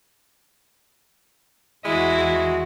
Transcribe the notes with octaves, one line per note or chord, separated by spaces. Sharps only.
E2 G#3 E4 F#4
G#3